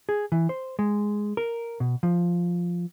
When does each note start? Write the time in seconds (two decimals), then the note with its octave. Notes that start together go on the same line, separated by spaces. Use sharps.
0.09 G#4
0.32 E3
0.49 C5
0.79 G#3
1.37 A#4
1.80 B2
2.03 F3